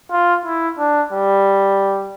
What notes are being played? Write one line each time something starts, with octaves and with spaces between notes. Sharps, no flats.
F4
E4
D4
G3